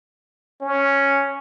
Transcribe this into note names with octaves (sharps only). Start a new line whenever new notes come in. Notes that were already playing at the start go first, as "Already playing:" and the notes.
C#4